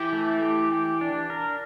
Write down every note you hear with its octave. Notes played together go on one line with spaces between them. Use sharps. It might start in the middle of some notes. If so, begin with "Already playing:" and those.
Already playing: E3 G4
A3
G4
G4
D4
A#4